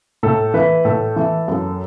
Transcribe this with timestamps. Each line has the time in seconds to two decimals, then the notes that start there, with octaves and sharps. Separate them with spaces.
0.23 A2 A4
0.54 E3 B4
0.85 A2 A4
1.16 E3
1.48 F#2